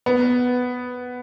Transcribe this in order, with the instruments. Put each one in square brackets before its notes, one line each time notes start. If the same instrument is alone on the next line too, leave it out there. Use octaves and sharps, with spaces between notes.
[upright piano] B3